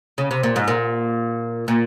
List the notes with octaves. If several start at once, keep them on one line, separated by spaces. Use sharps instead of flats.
C#3
C3
A#2
G#2
A#2
A#2